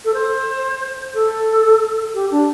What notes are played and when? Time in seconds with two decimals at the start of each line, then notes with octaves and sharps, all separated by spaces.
0.05 A4
0.14 C5
1.14 A4
2.14 G4
2.31 D4